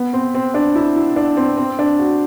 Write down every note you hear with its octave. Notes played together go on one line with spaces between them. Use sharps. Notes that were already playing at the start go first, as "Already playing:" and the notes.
Already playing: B3
C4
C4
D4
E4
E4
D4
C4
C4
D4
F#4